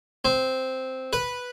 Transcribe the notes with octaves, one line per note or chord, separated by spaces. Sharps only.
C4
B4